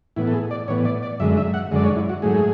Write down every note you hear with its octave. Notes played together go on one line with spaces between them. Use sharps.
A2 E3 B3 E4
A4
G#4
D5
A2 E3 B3 C#5
D5
D5
F#2 D3 G#3 E5
E5
F#5
F#2 D3 G#3 D5
C#5
E4
F#4
G#2 F#3 A3 G#4